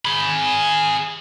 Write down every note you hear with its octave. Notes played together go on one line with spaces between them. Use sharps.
G#4 B5